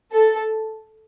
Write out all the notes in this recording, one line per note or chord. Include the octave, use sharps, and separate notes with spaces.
A4